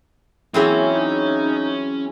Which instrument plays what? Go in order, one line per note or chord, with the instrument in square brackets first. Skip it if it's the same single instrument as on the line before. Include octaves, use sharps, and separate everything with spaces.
[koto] E3 F#3 C4 [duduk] A#3 [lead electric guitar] C#4 C#5 [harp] E4 G#4
[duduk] D#4